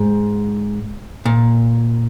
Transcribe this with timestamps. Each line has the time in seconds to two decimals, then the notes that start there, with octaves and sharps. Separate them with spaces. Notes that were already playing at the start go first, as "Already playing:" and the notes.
Already playing: G#2
1.25 A#2